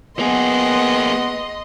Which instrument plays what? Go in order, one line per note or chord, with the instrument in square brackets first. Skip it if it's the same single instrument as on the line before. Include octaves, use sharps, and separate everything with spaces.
[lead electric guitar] A#3 G#4 [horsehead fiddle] B3 [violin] D#5 C6